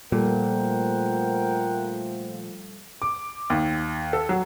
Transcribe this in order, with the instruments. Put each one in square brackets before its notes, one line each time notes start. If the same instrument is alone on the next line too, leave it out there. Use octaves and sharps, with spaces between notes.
[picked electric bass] A#2 [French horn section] F3 A3 [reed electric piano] G3 A4 [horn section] A#4 F#5 G5
[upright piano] D6
D#2
A4
F#3